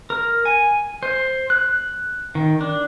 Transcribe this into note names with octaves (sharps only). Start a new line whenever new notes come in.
A#4
G#5
C5
F#6
D#3
D4